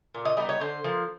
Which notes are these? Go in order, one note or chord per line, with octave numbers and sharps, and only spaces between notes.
A#2
D#5
G3 B3 D#4 D#5
C#5
D3 C5
F3 A#3